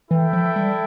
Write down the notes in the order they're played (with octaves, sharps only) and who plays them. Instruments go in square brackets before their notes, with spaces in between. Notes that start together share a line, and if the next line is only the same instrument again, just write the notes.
[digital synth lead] E3 [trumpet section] E4 A4 E5 G5
[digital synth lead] F3
G3